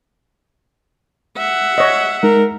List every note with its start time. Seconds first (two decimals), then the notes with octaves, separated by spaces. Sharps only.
1.37 E5 F#5
1.78 C#5 D#5
2.23 G#3 D#4 A#4